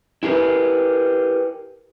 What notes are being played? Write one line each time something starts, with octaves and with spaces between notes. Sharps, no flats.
E4 G4 G#4 A#4 B4